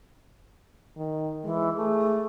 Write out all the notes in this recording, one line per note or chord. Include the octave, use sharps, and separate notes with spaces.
D#3
E3 G#3
A3 G#4